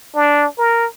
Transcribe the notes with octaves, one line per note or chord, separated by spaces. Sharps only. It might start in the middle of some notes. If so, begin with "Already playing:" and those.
D4
A#4